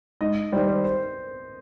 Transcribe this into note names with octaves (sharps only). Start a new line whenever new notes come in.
G#2 D#5
D#3 G3 C5
C5
C5